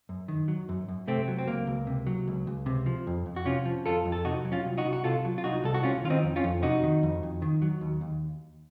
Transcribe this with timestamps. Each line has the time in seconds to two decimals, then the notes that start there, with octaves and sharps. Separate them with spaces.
0.09 F#2
0.28 D#3
0.48 F#3
0.69 F#2
0.88 F#2
1.07 C3 A3 C4
1.28 F#3
1.38 C4
1.47 C#2 A#3
1.67 C#2
1.87 C3
2.07 F#3
2.28 C#2
2.47 C#2
2.66 C3
2.86 F3
3.07 F2
3.26 F2
3.36 F#4
3.45 C3 C#4 F4
3.65 F3
3.86 F2 F4 A4
4.05 F2
4.12 A4
4.25 C3 D#4 F#4
4.45 F#3
4.52 C#4 F4
4.65 C2
4.78 D#4 F#4
4.85 C2
4.93 F#4
5.04 C3 F4 A4
5.25 F#3
5.38 F4
5.44 C2 D#4 F#4
5.64 C2 A4
5.74 F#4
5.83 C3 C#4 F4
6.04 D#3 F4
6.10 C4 D#4
6.23 F2
6.36 C#4 F4
6.44 F2
6.62 C3 D#4 F#4
6.83 D#3
7.03 F2
7.23 F2
7.42 D#3
7.62 F#3
7.81 D#2
8.01 D#2